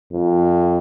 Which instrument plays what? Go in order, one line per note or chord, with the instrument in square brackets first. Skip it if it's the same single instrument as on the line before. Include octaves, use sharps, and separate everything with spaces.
[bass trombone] F2